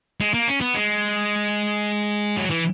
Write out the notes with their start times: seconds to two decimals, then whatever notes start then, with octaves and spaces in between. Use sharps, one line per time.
0.20 G#3
0.34 A#3
0.48 C#4
0.61 B3
0.75 G#3
2.37 F#3
2.50 E3